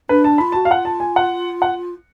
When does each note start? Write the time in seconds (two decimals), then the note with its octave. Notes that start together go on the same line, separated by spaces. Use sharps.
0.09 D4 B4
0.24 A5
0.38 F4 B5
0.52 F#4 A5
0.65 F5
0.70 F4 F#5
0.85 A5
1.00 G#5
1.16 F#5
1.62 F#5